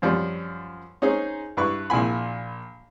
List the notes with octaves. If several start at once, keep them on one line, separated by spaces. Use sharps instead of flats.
F#2 F3 G3
C#4 D#4 G#4 C5
G2 E4 B4 B5 C#6
A#1 A#2 E4 G#5 B5